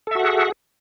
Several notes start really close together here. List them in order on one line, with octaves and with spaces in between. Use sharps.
A4 E5 F#4 F#5 G#4